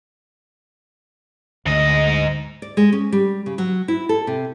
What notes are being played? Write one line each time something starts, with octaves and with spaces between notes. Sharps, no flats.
D2 G#2 D3 A3 D#5
D5
G#3
C#4
G3
C#3
F#3
E4
A4
C3